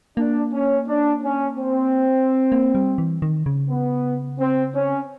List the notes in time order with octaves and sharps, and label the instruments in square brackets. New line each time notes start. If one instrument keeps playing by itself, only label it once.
[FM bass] A#3 [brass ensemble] D4
[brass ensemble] C#4
D4
C#4
C4
[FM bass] A#3
G3
E3
D#3
C#3
[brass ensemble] B3
C4
C#4